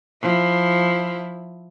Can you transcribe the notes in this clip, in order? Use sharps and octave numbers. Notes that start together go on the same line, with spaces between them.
F3 E4